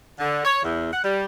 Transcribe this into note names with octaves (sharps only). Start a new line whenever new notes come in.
D3
C#5
E2
F#5
G3